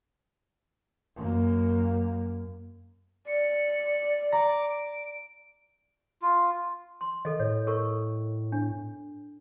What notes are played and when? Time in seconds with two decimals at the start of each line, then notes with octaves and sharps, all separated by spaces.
1.16 F#2 A#3
3.27 D5 C#7
4.32 A#5 D6 A#6
4.70 D7
6.22 F4
7.01 C6
7.25 D#3 A4 D#5
7.40 A2 C#5
7.67 A4 A#4 C#6
8.52 D4